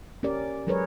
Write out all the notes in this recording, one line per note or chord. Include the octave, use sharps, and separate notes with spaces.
C#4 G4 A#4 D5
F#3 G#3 G#4 A#4 B4 C#5